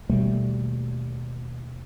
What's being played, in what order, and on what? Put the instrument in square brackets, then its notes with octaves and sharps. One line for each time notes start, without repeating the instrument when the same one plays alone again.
[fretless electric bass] D#2 B2 G3 A3